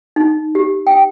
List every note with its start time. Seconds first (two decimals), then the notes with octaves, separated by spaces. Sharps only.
0.16 D#4
0.55 G4
0.87 G5